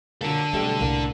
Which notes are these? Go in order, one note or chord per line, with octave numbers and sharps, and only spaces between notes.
A#2 F#3 D4 A4
B1 G3 A3 C4
C2 A2 D3 A#3